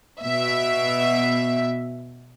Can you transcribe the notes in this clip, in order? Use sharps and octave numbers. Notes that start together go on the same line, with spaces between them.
B2 E5